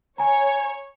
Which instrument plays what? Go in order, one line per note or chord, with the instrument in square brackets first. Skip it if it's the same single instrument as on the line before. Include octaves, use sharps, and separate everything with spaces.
[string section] C#5 [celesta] G#5 A#5